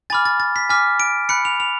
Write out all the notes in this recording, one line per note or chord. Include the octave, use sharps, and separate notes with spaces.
G#5 B5 D6 F6 A6
A6
A6
B6
G#5 D6 F6 B6
D7
B5 F#6 C#7
F7
F7